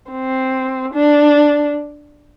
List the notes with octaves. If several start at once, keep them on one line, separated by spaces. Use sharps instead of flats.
C4
D4